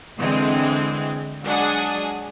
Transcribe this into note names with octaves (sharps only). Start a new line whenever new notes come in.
D3 E3 G#3 C4
F#3 G#3 D4 G#4 F#5